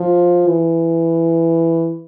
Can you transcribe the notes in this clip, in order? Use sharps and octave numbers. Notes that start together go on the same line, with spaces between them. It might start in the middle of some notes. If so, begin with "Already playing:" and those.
Already playing: F3
E3